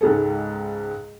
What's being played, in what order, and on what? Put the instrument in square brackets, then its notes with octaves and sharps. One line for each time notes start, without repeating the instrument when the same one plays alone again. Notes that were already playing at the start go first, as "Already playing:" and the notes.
[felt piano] C#2 G#2 G#3 G#4 A4